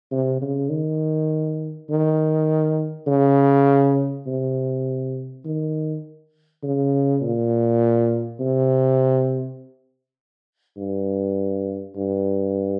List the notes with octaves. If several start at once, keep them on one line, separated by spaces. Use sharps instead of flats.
C3
C#3
D#3
D#3
C#3
C3
D#3
C#3
A#2
C3
G2
G2